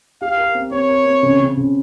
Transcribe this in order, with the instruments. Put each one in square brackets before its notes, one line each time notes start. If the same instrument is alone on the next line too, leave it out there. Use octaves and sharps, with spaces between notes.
[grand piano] G4 [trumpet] F5
[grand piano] A#4
C4
[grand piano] C4 [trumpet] C#5
[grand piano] A#4
C4
C#3
C#3
C#3